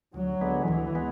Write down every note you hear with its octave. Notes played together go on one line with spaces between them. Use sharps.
D2 F#3
D3 G#3 B3
D2 E3
G#3 B3